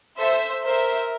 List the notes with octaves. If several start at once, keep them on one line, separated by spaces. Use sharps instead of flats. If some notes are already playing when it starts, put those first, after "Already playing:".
A4 C5 E5
A#4 C5 E5